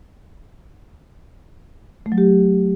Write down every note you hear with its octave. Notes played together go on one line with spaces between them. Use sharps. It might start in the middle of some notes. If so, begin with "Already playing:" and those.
A3
F#3
G4